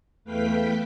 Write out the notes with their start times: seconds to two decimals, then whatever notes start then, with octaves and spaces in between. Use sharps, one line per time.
0.24 E2 A3 B4 F5 G5 B6